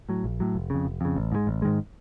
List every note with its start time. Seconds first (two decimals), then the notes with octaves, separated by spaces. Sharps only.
0.09 A2 F#3
0.24 A#1
0.40 A2 F#3
0.55 F1
0.70 F2 C#3
0.85 F1
1.01 F2 C#3
1.16 A1
1.32 G#2 D#3 G#3
1.47 A1
1.62 G#2 D#3 G#3